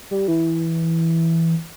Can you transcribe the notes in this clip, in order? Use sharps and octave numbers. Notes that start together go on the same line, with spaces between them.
G3
E3